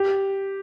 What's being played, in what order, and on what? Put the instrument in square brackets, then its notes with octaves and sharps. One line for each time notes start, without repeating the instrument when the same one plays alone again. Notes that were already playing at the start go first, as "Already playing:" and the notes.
Already playing: [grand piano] G4